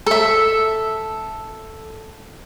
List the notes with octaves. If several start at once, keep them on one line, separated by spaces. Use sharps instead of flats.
A4 E5